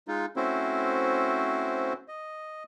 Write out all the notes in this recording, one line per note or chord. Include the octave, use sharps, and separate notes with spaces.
G#3 D#4 F4
A3 C4 C#4 E4 F#4 C5
D#5